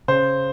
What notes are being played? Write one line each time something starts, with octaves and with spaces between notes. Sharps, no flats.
C#3 C5